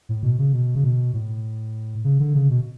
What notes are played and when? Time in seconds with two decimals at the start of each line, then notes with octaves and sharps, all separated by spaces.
0.09 A2
0.23 B2
0.39 C#3
0.53 B2
0.75 C#3
0.84 B2
1.14 A2
2.04 C#3
2.20 D3
2.35 C#3
2.50 B2